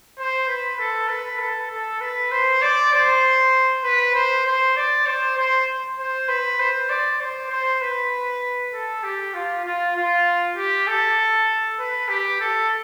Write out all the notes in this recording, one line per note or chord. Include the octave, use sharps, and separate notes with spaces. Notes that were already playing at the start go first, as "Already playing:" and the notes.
C5
B4
A4
B4
A4
A4
B4
C5
D5
C5
B4
C5
C5
D5
C5
C5
C5
B4
C5
D5
C5
C5
B4
A4
G4
F4
F4
F4
G4
A4
B4
G4
A4